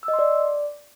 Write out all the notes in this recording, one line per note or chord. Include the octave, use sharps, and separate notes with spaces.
E6
D#5
C6
D5